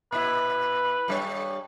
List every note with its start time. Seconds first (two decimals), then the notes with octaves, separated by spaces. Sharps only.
0.12 A#2 E4 B4
1.08 G2 G3 C#5